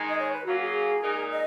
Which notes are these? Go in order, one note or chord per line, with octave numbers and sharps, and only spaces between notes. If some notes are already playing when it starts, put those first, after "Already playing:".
Already playing: D#3 G#3 D#4 G#4
D#5
C#5
B4
F#3 A#3 C#4 F4 F#4
G#4
A#2 G#3 D#4 A#4
D#5